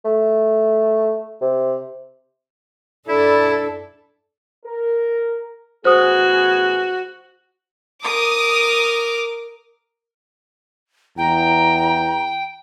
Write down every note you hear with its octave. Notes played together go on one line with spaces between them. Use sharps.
A3
C3
F#2 D4 E4 A4 D5 B5
A#4
A1 B3 F#4 G#4 C5 D#6
A#4 D6 D#6
E2 G5 A#5